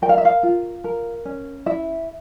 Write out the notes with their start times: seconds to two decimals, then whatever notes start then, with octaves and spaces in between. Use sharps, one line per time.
0.02 A#4 G5
0.09 F5
0.18 E5
0.25 F5
0.43 F4
0.84 A#4
1.25 C#4
1.66 E4 E5